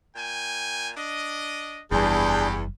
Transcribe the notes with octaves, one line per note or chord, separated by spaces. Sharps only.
A#2 G5 G#5
D4 D#5
F#1 E2 E3 G3 D4 G4 G#4 G6